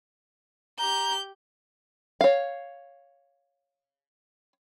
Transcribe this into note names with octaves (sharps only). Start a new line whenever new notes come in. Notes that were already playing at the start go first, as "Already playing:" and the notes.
G4 A#5 G6
C#5 F5